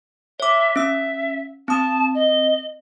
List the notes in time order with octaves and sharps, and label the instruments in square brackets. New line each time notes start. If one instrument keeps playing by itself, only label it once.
[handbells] C#5 D6 [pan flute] E5
[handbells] C#4 E6 [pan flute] E5
[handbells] C4 D#6 [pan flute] A5
[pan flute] D#5